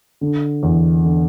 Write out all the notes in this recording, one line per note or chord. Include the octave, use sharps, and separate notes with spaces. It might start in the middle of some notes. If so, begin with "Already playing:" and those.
D3
E2
D3